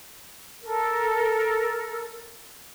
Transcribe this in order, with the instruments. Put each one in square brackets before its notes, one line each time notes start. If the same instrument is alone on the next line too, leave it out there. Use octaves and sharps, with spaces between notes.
[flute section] A4 A#4